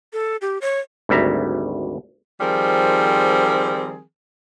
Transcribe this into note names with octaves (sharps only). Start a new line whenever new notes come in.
A4
G4
C#5
G#1 D2 G3 E5 A#5
D#3 F3 G3 C4 G#4 A#4